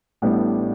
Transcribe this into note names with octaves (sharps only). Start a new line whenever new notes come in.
A1 A2 G3 B3 D4